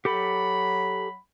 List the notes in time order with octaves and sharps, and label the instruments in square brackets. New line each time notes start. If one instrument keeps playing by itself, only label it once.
[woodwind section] F#3 F#5 B5 [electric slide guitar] G4 A4